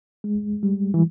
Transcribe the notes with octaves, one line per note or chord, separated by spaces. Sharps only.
G#3
G3
E3